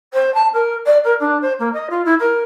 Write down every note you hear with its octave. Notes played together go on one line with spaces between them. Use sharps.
C5
A5
A#4
D5
A#4
D4
C5
A#3
D#5
F4
E4
A#4